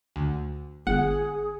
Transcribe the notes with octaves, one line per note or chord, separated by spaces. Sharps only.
D2
G1 G#4 F#5